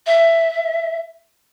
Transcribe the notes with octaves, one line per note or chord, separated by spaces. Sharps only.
E5